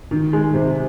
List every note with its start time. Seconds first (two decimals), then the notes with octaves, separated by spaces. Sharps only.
0.11 D#3
0.33 G#3
0.54 C3